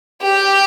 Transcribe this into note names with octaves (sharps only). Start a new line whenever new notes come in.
G4